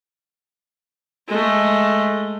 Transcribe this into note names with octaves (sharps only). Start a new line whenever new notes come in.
G#3 A3